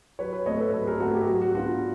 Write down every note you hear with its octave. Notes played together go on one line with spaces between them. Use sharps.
F#3 B4 C#5
B4 C#5
A3 C4 C#5 D#5
A4 B4
F#3 A4 B4
G#4 A#4
A3 C4 F#4
G4
F#3 F#4
F#4
B3 D4 F4 F#4